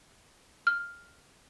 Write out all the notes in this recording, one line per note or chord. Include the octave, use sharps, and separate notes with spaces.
F6